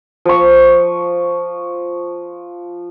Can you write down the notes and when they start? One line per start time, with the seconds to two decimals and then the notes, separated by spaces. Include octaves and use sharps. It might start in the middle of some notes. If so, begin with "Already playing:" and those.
0.25 F3 C#6